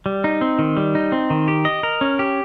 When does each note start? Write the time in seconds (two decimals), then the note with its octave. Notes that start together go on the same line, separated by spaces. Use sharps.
0.06 G3
0.24 D#4
0.41 C4
0.59 D#3
0.77 G3
0.95 D#4
1.12 C4
1.30 D#3
1.48 G4
1.65 D#5
1.83 A#4
2.01 C#4
2.19 G4